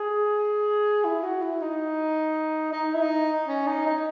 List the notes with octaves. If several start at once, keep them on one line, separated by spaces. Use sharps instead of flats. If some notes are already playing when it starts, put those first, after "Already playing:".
Already playing: G#4
E4
F#4
E4
D#4
D#4
E4
D#4
C#4
D#4
D#4